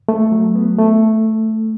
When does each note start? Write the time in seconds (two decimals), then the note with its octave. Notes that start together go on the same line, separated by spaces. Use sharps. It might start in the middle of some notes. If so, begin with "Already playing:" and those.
0.09 A3
0.32 F#3
0.55 B3
0.79 A3